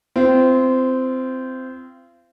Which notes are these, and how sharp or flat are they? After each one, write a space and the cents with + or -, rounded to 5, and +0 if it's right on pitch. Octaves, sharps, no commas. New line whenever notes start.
C4 -15 F4 -35